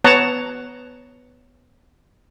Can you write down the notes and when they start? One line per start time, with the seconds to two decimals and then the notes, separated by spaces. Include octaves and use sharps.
0.04 B3 C#5 F#5 A5 A#5